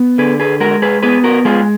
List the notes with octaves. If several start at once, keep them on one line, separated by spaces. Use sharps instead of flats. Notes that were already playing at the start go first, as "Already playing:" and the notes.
Already playing: B3
D3 G#4 B4
G#4 B4
G#3 F#4 A#4
G#4 B4
B3 G#4 B4
F#4 A#4
G#3 F4 G#4